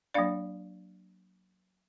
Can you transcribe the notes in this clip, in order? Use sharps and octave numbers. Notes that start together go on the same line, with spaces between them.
F#3 A#3 D4 D5 F5